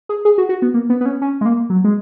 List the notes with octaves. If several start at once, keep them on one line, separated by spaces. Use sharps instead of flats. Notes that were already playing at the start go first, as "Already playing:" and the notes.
G#4
G#4
F#4
F#4
B3
A#3
B3
B3
C#4
C#4
G#3
A#3
F#3
G#3